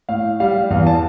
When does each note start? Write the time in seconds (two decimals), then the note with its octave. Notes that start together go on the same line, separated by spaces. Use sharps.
0.09 A2 F5
0.40 G3 F5
0.70 E2 F5
0.87 A5